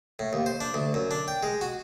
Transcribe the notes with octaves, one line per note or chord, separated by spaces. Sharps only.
A2
D#2
C5
D4
D2
F#2
D4
G5
G#3
F#4